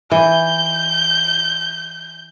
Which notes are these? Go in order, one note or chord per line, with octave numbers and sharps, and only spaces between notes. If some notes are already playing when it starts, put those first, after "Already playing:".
E3 G6